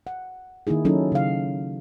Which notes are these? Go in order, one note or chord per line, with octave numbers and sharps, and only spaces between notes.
F#5
D#3 A#3 D#4 E4 G#4
F#3 C#4 D#4 E4 A4
C#3 F5